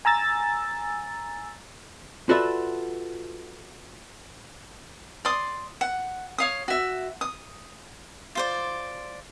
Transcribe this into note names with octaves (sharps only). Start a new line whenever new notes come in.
G#5 A#5 E6 A6
F4 F#4 A4 B4 D5 E5
D5 C6 D#6
F#5
C#5 F5 D#6
F#4 E5
D#6
F4 C5 D5